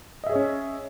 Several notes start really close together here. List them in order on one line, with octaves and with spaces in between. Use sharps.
D#5 E5 G#4 C#5 C#4